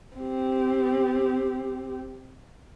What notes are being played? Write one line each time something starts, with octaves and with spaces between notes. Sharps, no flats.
C4 G4